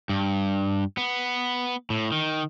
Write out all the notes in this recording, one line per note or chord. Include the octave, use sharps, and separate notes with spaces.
G2
B3
A2
D#3